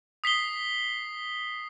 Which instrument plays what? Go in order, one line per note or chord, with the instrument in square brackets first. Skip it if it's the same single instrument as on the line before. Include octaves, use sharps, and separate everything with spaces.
[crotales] D#6 B6 C7 G7